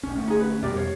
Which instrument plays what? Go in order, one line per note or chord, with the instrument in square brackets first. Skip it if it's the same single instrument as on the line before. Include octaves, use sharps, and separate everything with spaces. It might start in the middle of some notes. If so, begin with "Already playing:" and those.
[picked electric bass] A#1 C#4
G1 A3 C#4
[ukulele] D#4 G#4
B4
[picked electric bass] F2 B2 G3 [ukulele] G4 A#4 D5
[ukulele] C#5 F5